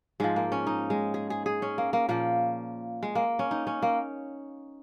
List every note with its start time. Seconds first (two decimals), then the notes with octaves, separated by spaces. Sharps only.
0.20 G#2 F3 G#3
0.36 A#3
0.52 C#4
0.67 D#4
0.90 G#3
1.14 G#4
1.30 G#4
1.46 G#4
1.62 C#4
1.78 A#3
1.93 A#3
2.09 A#2 F3 A#3
3.03 G#3
3.15 A#3
3.39 C#4
3.51 D#4
3.67 C#4
3.82 A#3